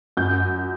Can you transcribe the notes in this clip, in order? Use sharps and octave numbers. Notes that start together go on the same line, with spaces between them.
F#2 G6